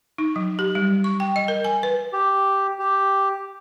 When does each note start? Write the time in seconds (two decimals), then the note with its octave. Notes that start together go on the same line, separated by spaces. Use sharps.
0.18 D#4
0.36 F#3
0.59 G4
0.75 G3
1.04 C#6
1.20 G5
1.36 D#5
1.48 A#4
1.65 G#5
1.83 B4
2.13 G4
2.79 G4